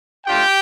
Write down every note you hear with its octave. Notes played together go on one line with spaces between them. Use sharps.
A3 D4 F4 G4 G5